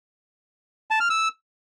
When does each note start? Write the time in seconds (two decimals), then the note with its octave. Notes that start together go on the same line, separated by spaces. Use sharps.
0.91 A5
1.00 F6
1.10 E6